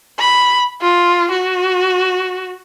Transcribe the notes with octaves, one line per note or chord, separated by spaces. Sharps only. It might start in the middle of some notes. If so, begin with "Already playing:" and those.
B5
F4
F#4